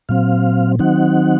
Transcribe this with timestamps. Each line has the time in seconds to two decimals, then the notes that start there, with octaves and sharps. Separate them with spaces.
0.09 A#2 F#3 C4 F5
0.79 D#3 F#3 C4 D#4 F#5